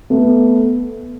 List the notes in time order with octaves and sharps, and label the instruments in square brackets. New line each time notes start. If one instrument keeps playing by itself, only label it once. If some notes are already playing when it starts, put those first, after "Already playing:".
[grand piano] A3 B3